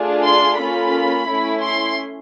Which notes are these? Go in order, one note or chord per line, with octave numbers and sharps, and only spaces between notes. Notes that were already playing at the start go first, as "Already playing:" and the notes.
Already playing: A3 D4 F4 G#4
C6
A#3 C#4 F4 A4 B5
A3 C#4 E4
C6